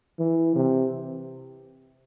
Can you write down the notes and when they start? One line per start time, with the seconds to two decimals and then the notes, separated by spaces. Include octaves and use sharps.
0.19 E3
0.56 C3